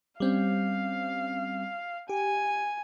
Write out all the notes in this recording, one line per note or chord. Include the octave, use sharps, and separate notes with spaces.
G3 C4 C#4 F5
G4 G#5